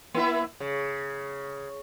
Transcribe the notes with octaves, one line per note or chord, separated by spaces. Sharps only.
A#3 E4 E5
C#3